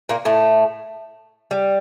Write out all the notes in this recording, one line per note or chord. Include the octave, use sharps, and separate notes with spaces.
A#2 A#3
A2 A3
G3